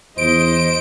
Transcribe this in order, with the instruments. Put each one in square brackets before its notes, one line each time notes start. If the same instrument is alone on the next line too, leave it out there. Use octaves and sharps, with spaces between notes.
[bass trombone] E2 [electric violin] C5 D#5 [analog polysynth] D7